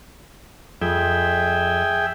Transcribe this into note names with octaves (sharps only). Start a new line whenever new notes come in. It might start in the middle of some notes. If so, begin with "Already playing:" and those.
F2 G#4 E5 G5